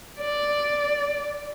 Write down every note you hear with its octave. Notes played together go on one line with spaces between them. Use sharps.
D5